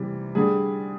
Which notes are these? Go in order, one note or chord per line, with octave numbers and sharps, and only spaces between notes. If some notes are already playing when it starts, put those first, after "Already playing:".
Already playing: C3 E3 G3
D3 G3 G#4